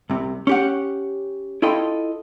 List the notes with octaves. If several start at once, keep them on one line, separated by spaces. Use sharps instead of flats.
C2 C3
C#4 G4 F#5
E4 F4 A4 D#5 G5 C6